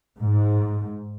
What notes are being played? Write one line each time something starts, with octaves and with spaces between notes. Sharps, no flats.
G#2